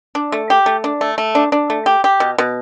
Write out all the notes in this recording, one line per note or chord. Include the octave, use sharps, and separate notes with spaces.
D4
A3
G4
A3
D4
A3
A3
D4
D4
A3
G4
G4
B2
B2